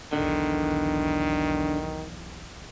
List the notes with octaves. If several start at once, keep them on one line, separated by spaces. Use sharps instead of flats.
B1 E2 D3 D#3